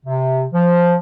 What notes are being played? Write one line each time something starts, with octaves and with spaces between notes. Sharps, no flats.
C3
F3